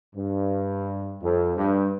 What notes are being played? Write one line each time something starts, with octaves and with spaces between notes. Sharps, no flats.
G2
F2
G2